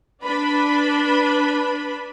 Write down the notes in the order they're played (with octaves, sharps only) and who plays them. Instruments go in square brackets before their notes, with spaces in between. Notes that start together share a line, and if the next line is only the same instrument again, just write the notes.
[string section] D4 B4 B5